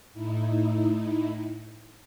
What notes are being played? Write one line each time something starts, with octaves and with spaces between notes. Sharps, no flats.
A2 D#4 E4